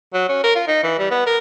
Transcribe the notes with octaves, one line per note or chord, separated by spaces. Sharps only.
F#3
C#4
A#4
F4
D#4
E3
G3
B3
A#4